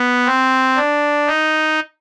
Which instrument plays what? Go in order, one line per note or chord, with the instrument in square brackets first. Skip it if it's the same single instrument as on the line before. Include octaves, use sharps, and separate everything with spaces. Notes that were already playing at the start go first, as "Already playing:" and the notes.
Already playing: [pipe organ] B3
C4
D4
D#4